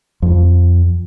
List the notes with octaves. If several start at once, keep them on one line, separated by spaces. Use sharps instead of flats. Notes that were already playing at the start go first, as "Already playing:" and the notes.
F2